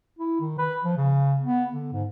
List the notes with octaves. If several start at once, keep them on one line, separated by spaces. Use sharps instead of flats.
E4
D#3
B4
F3
C#3
B3
D3
G#2